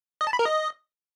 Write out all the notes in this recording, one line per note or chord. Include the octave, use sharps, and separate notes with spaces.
D#5
A5
B5
A#4
D#5